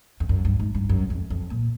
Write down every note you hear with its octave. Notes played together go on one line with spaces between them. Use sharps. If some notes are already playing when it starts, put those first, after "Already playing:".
F2
F#2
G2
G#2
G2
F#2
F2
F2
A#2